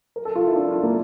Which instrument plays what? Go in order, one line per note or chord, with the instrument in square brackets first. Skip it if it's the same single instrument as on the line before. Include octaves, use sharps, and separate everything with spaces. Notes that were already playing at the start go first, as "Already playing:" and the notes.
[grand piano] A#4
A4
F4
E4
D4
F4
A#3